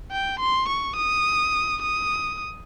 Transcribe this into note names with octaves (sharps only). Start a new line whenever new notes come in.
G5
C6
C#6
D#6
D#6